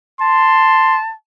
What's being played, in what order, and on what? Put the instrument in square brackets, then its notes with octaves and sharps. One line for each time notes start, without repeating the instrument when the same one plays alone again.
[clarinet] A5 [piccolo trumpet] C6